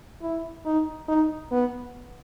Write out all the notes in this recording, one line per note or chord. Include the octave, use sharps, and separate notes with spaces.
E4
D#4
D#4
B3